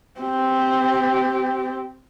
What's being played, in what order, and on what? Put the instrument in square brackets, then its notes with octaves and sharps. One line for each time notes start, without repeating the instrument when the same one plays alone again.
[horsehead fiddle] C4 G4